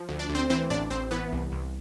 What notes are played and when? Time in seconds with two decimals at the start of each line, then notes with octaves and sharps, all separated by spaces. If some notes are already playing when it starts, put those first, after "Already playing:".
Already playing: F3
0.09 D2
0.19 D4 D5
0.30 D2
0.35 C4 C5
0.50 E3 C4 C5
0.70 A1 D4 D5
0.90 A1 C4 C5
1.11 E3 B3 B4
1.32 C2
1.52 C2